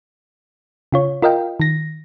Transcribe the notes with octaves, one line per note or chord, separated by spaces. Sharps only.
C#3 F4 C#5
F4 A#4 D#5 F5 G5
D#3 A#6